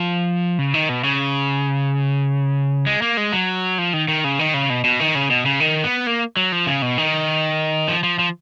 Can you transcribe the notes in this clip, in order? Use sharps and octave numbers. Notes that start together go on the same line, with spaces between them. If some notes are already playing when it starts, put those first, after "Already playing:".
Already playing: F3
C#3
D#3
B2
C#3
G#3
A#3
G#3
F#3
F3
D#3
D#3
C#3
D#3
C#3
B2
B2
D#3
C#3
B2
C#3
D#3
B3
A#3
F#3
F3
C#3
B2
D#3
F3
F3
F3